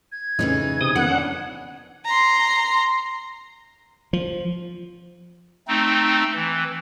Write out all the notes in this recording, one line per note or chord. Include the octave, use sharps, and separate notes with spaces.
G#6
F2 A2 C#3 E3 D#4
C3 D#6
F2 D#3 B3 E4 F#5
C#4 D4
A#5 C6
F3
A3 C4 D#4
E3